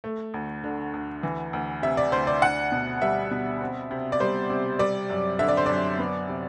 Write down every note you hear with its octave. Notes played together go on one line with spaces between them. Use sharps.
A3
D2
D3
D2
E3
D2
C3 E5
D5
D2 C5
D5
D4 F#5
B2
G3 E5
B2
C4
C3
D5
G3 C5
C3
G3 D5
F#2
D3 E5
D5
C5
F#2 D5
B3
C3